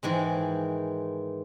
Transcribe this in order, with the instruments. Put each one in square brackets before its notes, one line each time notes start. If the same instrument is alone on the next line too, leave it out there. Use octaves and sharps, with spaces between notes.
[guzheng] G#2 D#3 E3 G#3